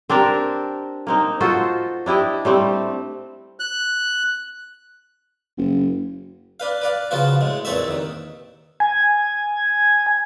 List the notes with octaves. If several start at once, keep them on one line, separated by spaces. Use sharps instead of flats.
C4 D4 G4 A#4
A#3 C4 D#4
F4 F#4 A4 C5
D4 E4 G4 D#5
G3 A3 C4
F#6
F#1
D4 B4 F5
B4 D5 F5
C#3 F3 B3 F4 F#4
A2 G#3
A#1 E2 C4 A4 C#5 E5
D#2 D#3
G#5